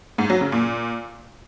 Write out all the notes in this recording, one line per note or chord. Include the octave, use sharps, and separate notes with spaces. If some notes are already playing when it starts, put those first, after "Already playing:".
G#2
F#3
C#3
A#2